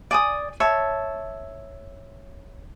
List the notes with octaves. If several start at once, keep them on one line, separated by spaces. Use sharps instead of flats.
D5 G#5 D#6
C#5 E5 A5